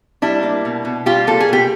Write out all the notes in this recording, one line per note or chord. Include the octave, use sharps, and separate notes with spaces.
G3 D4 E4
A#3
B2
B2
G3 F4 G4
A#3 A4
G#4
B2 G4